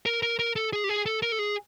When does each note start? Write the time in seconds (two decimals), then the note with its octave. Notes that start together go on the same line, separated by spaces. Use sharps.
0.06 A#4
0.22 A#4
0.39 A#4
0.56 A4
0.73 G#4
0.84 G4
0.89 G#4
1.06 A4
1.22 A#4
1.32 A4
1.39 G#4